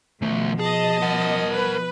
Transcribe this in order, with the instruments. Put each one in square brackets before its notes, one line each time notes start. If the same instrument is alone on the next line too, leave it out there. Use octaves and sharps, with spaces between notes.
[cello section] B2 F3 [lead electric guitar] D#3 A3
[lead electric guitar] G#4 [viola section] D#5 A5
[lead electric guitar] A#4 F#5
[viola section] B4